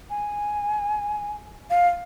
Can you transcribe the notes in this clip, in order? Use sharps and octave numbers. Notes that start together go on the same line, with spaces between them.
G#5
F5